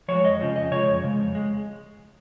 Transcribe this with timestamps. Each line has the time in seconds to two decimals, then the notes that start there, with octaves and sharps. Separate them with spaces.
0.08 F3 G#3 C#5
0.24 F2 D#5
0.39 C#3 F3 G#3
0.56 F2 D#5
0.71 C#3 F3 G#3 C#5
0.87 F2
1.03 C#3 G#3
1.18 F2
1.35 G#3